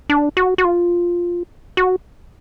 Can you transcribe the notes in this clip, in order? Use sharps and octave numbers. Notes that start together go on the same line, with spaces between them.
D4
F#4
F#4
F4
F#4